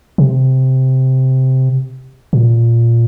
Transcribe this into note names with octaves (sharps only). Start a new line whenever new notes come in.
C3
A#2